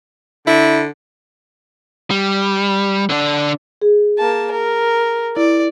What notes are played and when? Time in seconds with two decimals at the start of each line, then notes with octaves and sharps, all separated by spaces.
0.47 D3 E4
2.11 G3
3.10 D3 D4
3.82 G#4
4.18 A#3 A5
4.51 A#4
5.37 E4 D5